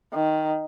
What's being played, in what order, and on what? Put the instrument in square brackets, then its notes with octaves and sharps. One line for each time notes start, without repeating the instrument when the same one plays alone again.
[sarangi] D#3